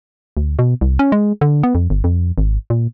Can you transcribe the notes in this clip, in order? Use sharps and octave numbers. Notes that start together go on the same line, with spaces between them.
D2
B2
C2
C#4
G#3
D3
B3
F2
G1
F2
G#1
A#2